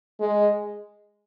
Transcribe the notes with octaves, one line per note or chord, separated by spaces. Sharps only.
G#3